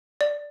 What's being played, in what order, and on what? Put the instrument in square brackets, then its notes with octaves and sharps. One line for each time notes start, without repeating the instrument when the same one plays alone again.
[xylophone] D5